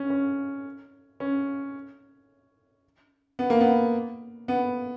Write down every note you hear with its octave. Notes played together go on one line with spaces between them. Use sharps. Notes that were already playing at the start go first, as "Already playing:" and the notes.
Already playing: C#4
C#4
C#4
B3
A#3
B3
B3